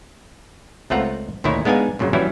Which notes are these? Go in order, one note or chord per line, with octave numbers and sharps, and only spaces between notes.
C#2 A3 C4 F4 F#5 A#5
D2 A#2 D#3 E4 C#5
G#3 B3 D4 D#4 F5 G#5
F#2 A#2 C#3 F#3
E3 F#3 G3 C#4 E4